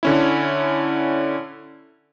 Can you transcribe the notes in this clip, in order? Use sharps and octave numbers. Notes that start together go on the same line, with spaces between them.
D3 C#4 E4